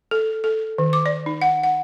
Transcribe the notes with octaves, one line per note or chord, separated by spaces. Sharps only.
A4
A4
D#3
D6
D5
D#4
F#5
F#5